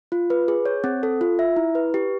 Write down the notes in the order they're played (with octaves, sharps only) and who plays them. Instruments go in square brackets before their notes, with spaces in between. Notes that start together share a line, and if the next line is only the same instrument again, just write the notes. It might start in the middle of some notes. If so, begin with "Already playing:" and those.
[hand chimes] F4
B4
G#4
C#5
C4
A4
F4
E5
E4
B4
G4